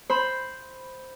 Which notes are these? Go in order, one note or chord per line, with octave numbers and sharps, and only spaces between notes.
C5 B5